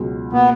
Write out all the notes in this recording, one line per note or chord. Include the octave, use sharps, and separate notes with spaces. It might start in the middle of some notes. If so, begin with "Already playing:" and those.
Already playing: C#2 B2 F#3
B2 A#3 B3